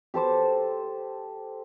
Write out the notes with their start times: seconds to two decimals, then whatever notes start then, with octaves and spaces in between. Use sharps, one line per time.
0.14 G4 A4 C5 D6